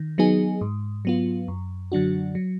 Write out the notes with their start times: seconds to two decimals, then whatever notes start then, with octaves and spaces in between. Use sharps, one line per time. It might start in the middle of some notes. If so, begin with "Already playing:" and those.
Already playing: D#3
0.18 F#3 B3 D#4 G#4
0.61 G#2
1.05 F#3 B3 F4
1.48 F#2
1.92 D3 F#3 D4 F#4
2.35 F#3